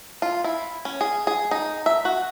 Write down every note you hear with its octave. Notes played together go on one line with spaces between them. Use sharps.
F4
E4
C#4
G#4
G#4
D#4
E5
F#4